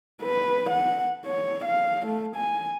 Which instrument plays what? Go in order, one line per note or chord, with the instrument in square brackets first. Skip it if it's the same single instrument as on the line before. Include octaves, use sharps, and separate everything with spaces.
[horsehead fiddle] B4
F#5
C#5
F5
A3
G#5